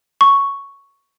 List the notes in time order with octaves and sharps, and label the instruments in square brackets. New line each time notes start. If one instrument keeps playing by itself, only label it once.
[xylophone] C#6